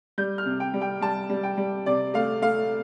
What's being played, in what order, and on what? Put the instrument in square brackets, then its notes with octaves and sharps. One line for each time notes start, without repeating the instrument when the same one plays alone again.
[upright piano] G3 G6
F6
C3
G5
G3
G5
G3 A5
G3
G5
G3
C3 D5
A3 F5
A3 F5